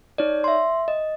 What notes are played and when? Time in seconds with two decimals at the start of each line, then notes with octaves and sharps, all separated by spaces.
0.18 D#4 C#5 D5
0.44 E5 C6
0.88 D#5